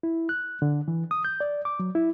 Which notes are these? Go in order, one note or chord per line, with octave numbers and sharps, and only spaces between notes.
E4
F#6
D3
E3
D#6
G6
D5
D6
F#3
E4